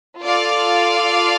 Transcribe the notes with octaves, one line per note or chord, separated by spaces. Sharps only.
F4 A4 D5 F5